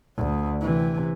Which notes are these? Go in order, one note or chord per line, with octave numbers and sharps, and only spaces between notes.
D2
C3 E3